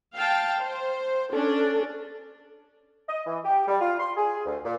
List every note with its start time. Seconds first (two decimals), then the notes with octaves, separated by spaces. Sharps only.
0.17 F5 G5 A5
0.61 C5
1.33 C#4 D4 A4 D5
3.08 D#5
3.26 E3
3.45 G4
3.68 G3
3.81 F4
4.00 C6
4.17 G#4
4.46 D2
4.65 A#2